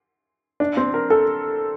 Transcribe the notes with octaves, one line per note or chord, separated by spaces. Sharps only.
D4
C4
A#4
A4